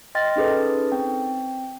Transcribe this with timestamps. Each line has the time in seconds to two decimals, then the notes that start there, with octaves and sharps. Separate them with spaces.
0.15 D#5 G5 C6 F6 A6 A#6
0.36 C#4 D#4 G#4 A4 B4
0.92 C4 G5